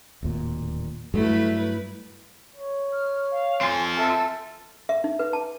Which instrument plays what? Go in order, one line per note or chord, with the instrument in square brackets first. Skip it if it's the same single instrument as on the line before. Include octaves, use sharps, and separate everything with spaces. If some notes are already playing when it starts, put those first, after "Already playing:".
[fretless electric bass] D1 D#2 A#2
[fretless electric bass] G2 F#3 [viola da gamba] A3 E4 B4
[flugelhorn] C#5
[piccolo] F6
F5
[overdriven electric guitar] C4 F4 [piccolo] G#5
[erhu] A4 [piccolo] E5
[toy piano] E5
D#4
B4
A5